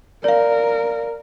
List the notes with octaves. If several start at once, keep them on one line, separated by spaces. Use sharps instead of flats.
A#4 D5 F5